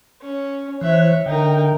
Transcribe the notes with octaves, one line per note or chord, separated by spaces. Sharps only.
C#4
E3 C5 C#5 E5 F#6
D3 D#4 A#4 G5